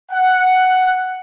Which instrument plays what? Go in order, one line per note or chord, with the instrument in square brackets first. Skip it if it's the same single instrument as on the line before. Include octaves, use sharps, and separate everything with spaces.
[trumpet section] F#5